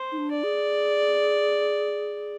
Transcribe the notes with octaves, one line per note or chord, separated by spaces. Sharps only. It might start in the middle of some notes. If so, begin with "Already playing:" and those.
Already playing: C5
D#4
D4
D5
G#4